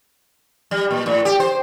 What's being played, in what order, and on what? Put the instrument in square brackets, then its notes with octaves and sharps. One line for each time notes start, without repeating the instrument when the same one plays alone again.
[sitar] G3
A#2
A2
G4
C5